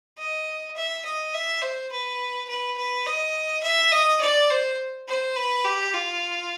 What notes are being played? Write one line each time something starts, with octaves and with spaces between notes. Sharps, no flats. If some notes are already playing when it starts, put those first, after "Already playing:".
D#5
E5
D#5
E5
C5
B4
B4
B4
D#5
E5
D#5
D5
C5
C5
B4
G4
F4